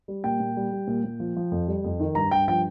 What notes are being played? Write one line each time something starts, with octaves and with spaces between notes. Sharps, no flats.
G3
A#2 G5
A#2
G3
G3
A#2
A#2
F3
F3
F2
G3
F2
D#3
G2 A#5
G2 G5
F3 G5